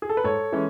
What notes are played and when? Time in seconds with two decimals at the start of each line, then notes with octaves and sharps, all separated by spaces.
0.02 G#4
0.09 A4
0.17 B4
0.24 G#2 A4 C#5
0.52 E3 G#3 C#4